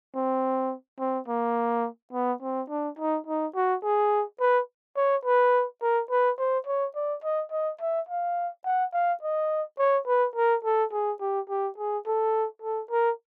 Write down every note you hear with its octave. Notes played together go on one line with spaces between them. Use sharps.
C4
C4
A#3
B3
C4
D4
D#4
D#4
F#4
G#4
B4
C#5
B4
A#4
B4
C5
C#5
D5
D#5
D#5
E5
F5
F#5
F5
D#5
C#5
B4
A#4
A4
G#4
G4
G4
G#4
A4
A4
A#4